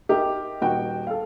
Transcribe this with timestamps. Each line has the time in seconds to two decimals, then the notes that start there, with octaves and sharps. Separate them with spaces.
0.09 D#4 G4 A#4 E5
0.61 D#1 D#4 F#4 G5
1.07 A4 F5